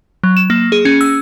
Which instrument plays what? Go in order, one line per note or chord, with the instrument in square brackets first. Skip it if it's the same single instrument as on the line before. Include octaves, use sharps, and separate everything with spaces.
[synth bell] F#3
E7
A#3
G#4
C#4
E6